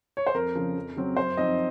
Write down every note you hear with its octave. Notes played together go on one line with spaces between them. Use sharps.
C#5
C5
F2 A#4
C#3 F3
F2
C#3 F#3 C4
F#2 C5
F3 C4 D#4 D#5